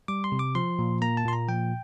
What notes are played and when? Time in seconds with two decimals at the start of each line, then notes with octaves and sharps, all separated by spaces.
0.08 G3 D6
0.24 C6
0.32 C3
0.39 D6
0.55 F3 C6
0.79 A#2
1.02 A#3 A#5
1.17 A5
1.25 A#2 C6
1.33 A#5
1.48 F3 G5